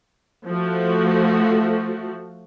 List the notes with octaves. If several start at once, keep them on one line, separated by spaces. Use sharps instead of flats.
F3 A3 F#4